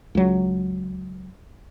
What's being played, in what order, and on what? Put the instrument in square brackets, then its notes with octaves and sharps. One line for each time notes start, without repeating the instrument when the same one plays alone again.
[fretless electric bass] C#2 F#3